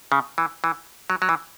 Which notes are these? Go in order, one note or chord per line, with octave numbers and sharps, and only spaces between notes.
C#3
E3
E3
F#3
F#3
E3